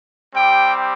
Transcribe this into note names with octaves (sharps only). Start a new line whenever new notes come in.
G3 C4 G4 G5